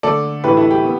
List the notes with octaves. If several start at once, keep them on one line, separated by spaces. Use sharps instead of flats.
D3 A3 A4 D5
A2 E3 A3 G4 B4
E4 A4
G4
B3